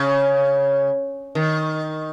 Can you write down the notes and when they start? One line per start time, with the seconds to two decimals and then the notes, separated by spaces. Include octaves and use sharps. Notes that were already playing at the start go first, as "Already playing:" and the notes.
Already playing: C#3
1.35 D#3